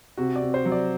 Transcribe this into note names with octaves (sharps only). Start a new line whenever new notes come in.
C3 F#4
D5
C3
C5
F#3
D5